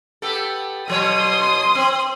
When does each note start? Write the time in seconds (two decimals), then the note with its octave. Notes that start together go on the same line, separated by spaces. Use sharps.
0.22 B3 G4 A4
0.88 B2 F#3 C#5 C6 D#6
1.75 C4